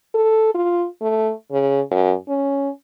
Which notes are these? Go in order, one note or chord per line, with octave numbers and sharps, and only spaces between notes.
A4
F4
A3
C#3
F#2
C#4